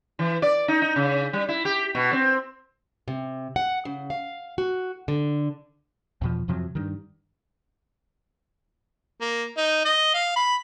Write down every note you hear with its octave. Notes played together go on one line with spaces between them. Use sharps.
E3
D5
D#4
D#4
C#3
G3
E4
G4
B2
C4
C3
F#5
C#3
F5
F#4
D3
E2 B2 F3
F2 C3 F3 F#3
G2 D#3
A#3
D#4
D#5
F5
B5